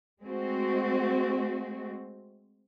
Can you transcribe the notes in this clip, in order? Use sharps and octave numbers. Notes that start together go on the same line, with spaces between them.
G#3 A3 C4 F#4